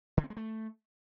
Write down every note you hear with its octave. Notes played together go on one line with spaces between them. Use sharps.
D3
C4
G#3
A3